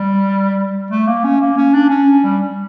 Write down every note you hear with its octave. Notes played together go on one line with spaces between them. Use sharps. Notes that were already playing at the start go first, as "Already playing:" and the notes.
Already playing: G3
A3
A#3
C#4
A#3
C#4
D4
C#4
G3